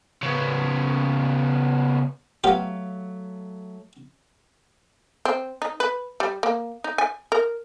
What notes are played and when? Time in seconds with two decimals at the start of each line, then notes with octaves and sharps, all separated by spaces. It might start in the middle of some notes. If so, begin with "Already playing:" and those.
0.23 C#3 B3
2.44 F#3 A3 B3 F4 G4 F5
5.25 C4
5.62 D#4
5.80 B4
6.20 G3
6.43 A#3
6.84 D#4
6.98 G#5
7.32 A#4